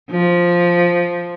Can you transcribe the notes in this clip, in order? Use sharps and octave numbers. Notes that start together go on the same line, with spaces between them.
F3